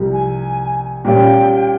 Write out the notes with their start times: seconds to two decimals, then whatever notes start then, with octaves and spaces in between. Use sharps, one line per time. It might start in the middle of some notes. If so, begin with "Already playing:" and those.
Already playing: C2 C3 F3
0.13 G#5
1.05 A#2 G3 C#4 F4 G5